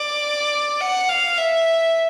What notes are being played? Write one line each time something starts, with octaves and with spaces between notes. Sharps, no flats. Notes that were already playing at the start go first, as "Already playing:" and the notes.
Already playing: D5
F#5
F5
E5